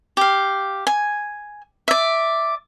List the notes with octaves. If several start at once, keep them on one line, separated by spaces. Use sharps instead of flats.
G4 F5
G#5
D5 E5